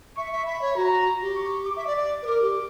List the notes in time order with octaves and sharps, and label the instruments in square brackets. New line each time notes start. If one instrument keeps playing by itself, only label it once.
[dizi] E5 [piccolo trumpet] C#6
[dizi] E5
[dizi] E5 [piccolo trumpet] B5
[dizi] C#5
[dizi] F#4 [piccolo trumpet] A#5
[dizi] G4
[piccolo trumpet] C#6
D6
[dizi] E5
D5
D5
B4
[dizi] A#4 [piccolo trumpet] D6
[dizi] G4